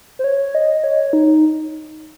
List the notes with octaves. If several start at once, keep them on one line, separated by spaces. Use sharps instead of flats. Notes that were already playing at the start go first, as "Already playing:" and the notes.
C5
C#5
D#5
C#5
D#4